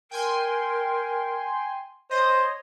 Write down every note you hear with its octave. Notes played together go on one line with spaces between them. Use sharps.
A#4 G5 G#5 C6
C5 C#5 D#5